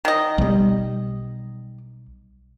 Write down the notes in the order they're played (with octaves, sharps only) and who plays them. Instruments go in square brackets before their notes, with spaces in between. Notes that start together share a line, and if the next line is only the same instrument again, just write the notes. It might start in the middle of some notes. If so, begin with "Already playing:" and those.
[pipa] D#3 D#5
[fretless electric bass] B1 G3